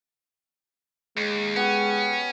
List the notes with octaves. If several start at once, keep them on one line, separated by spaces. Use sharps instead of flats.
D#2 G#3
B3 C#4 G4